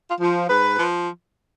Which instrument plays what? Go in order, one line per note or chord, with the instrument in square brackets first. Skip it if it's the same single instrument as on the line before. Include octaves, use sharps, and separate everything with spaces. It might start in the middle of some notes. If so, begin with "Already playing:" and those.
[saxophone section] F4
F3
G#2 B4
F3